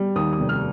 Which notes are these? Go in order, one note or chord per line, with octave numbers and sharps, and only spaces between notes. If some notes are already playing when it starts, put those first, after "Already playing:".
Already playing: G3
D#2 D#6
D#6
F1
F6